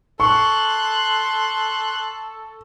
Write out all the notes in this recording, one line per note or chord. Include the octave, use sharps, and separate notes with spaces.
A4 C6 C#6 F#6